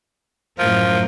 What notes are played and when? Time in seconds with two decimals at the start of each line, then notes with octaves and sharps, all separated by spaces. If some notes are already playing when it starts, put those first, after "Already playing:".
0.59 F#2 A2 F3 A#4